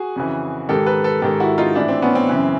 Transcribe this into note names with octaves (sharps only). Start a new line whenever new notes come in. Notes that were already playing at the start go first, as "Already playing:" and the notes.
Already playing: F#4 G#4
F2 C#3 E3
G#2 D#3 G4 A4
A4 B4
A4 B4
G#2 D#3 G4 A4
E4 F#4
D#4 F4
A2 E3 D4 E4
C4
B3 C#4
C4
F#2 C#3 E3